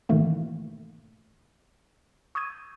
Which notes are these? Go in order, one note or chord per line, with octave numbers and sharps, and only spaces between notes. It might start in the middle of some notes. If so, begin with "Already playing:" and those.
G#2 B2 D#3 E3 A3 A#3
C#6 D#6 E6 G6 G#6 D#7